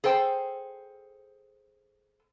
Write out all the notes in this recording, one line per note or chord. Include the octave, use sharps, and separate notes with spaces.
G#4 A4 C5 G5